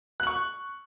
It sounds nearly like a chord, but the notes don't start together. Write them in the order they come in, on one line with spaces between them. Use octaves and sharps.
F#6 F#7 C#6